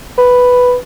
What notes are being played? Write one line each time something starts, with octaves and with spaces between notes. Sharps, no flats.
B4